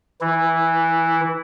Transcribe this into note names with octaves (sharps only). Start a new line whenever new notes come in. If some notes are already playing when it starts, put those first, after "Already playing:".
E3 E4